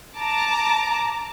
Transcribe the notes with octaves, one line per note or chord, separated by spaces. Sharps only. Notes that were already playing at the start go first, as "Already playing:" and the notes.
A5 A#5 D6